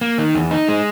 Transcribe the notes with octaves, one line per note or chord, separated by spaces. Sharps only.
A#3
D#3
E2
D#4
G#3